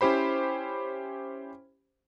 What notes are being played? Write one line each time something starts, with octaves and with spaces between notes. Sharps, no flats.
C#4 E4 G4 C5 B5